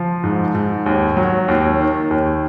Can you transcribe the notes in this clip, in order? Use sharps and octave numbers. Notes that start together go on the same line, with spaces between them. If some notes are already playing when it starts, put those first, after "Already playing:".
Already playing: F3
G#2
G#2
D#2
F#3
D#2
D#3
D#2